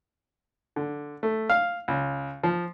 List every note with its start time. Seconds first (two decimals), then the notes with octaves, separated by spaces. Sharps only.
0.76 D3
1.23 A3
1.50 F5
1.88 C#2
2.44 F3